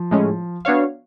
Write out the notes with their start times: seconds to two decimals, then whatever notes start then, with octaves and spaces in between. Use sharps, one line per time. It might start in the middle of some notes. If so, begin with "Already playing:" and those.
Already playing: F3
0.11 A2 G#3 C#4
0.65 B3 D4 F#4 C#5 F5